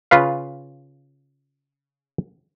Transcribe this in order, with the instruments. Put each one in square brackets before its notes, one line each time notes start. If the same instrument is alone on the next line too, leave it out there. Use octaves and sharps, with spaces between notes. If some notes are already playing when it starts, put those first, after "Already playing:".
[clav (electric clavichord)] C#3 F4 B4 F5